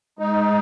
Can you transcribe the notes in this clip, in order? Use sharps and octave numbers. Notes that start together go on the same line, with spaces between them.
G#3 D#4